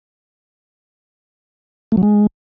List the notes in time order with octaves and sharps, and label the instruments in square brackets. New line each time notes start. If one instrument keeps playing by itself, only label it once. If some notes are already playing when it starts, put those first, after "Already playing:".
[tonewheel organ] A3
F#3
G#3